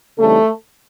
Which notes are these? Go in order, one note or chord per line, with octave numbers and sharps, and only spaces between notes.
C#3 E3 G3 A3 C4 D#4 A4